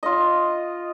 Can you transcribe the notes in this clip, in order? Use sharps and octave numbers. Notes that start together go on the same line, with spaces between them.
F4 D#5